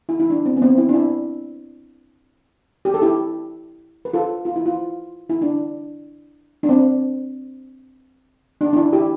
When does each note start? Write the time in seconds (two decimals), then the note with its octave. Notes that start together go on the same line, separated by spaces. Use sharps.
0.09 E4
0.20 E4
0.30 D4
0.46 C4
0.57 B3
0.62 C4
0.78 E4
0.89 D4
0.94 E4
2.85 G4
2.94 A4
3.02 E4 G4
4.05 B4
4.13 F4 A4
4.45 F4
4.56 E4
4.66 F4
5.30 E4
5.42 D4
6.63 D4
6.69 C4
8.61 D4
8.73 D4
8.77 E4
8.93 E4 G4